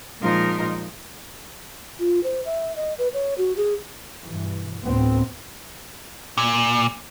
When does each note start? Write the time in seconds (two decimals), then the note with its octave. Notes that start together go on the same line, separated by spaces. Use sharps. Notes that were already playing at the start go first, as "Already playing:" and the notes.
0.21 A#2 F3 G#3 D#4 F4 A#4
1.99 F4
2.23 C5
2.45 E5
2.76 D#5
2.98 B4
3.14 C#5
3.38 F#4
3.57 G#4
4.23 G2 B2 E3
4.84 D2 A2 B3 C4
6.38 A#2